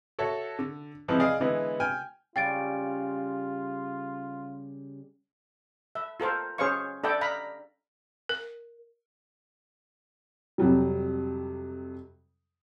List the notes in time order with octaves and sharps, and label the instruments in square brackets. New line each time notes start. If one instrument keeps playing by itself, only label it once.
[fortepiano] F#4 A4 C#5 E5
D3
C3 E3 F3 G#3
G#4 D5 D#5 F5
D3 E3 G#3 B3
G5 G#5 F6
[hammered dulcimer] C#3 G3 [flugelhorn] F4 [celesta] G5 A6 D7
[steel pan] E5
F4 A4 A#4 C5
C#4 G#4 C5 C#5 F5 C#6
D4 A4 D5 E5 G5
F5 A#5 B5
[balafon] A#4
[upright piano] F2 C3 F#3 G3